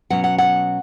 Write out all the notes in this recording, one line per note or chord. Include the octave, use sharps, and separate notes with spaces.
B2 F#3 C#4 F#5
F#5
F#5